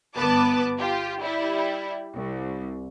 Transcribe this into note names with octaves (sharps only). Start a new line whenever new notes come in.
G1 B3 B4 A5 D6
F4 G4
G3 E4
C2